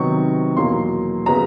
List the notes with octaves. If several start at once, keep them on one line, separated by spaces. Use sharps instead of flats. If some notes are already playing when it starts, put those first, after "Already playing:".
Already playing: C3 D#3 F#3 B3 C#6
E2 B2 F#3 A#3 C6
C#3 F#3 B3 A#5